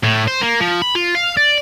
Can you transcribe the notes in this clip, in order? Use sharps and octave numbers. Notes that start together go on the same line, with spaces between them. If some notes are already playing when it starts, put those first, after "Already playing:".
A2
C5
A#3
F3
B5
F4
F5
D5